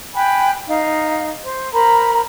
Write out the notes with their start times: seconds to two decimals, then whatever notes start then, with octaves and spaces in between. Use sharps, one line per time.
0.15 G5 G#5 B5 F#6
0.68 D#4 F5
1.43 C5
1.73 A#4 C5 A#5 B5